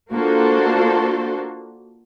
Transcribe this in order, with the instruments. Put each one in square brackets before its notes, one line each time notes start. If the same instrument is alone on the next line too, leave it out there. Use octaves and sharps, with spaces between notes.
[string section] A#3 D4 F4 F#4 A4 C5